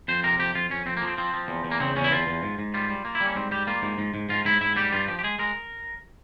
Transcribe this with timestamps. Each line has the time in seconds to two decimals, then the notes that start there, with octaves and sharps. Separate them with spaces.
0.08 F2 C5
0.24 C3 A#4
0.39 F2 G4
0.55 F2 F4
0.70 F2 C#4
0.86 F2 C4
0.97 A#3
1.02 F3
1.07 C4
1.18 F3 C4
1.34 F3
1.48 E2
1.65 E2
1.71 A#3
1.80 C#3 C4
1.96 E2 C#4
2.04 E4
2.11 E2 F4
2.27 E2
2.43 G#2
2.59 G#2
2.74 G3 F4
2.89 G3
3.05 A#3
3.15 E4
3.21 G3 C#4
3.36 G#2 C4
3.51 G3 G4
3.67 A#3 F4
3.82 G#2
3.98 G#2
4.14 G#2
4.29 G#2 F4
4.45 G#2 E4
4.61 G#2 E4
4.76 G3 G4
4.92 G2 F4
5.08 F3 G4
5.19 G4
5.24 G#3 G#4
5.39 G#3 A#4